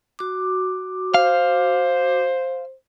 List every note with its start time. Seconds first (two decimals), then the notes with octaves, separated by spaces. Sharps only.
0.19 F#4 D6
1.14 C5 F5